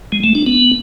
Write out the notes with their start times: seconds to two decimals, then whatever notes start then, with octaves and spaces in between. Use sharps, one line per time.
0.12 G#3
0.24 A3
0.35 D4
0.47 B3